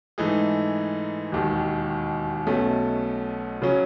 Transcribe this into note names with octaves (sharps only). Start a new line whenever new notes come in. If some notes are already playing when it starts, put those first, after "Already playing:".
G#2 E3 A3 D#4 G#4
E1 D#2 D#3
B1 B2 A3 C#4
C#3 F#3 C#4